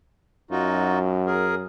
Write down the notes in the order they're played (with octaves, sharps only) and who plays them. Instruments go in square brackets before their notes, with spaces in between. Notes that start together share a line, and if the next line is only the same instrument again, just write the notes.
[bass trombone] F#2 [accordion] D#4 F4 F#4
[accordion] G#4 A#4